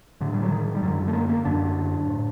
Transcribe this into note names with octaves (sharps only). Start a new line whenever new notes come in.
A2 D3
G3
F#3
D#3
G3
F#2 D3 F#3
A3
A#3
A#3
F#2 D3 D4
A2